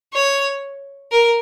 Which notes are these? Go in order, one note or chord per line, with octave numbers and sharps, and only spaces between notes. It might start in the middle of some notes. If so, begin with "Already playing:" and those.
C#5
A#4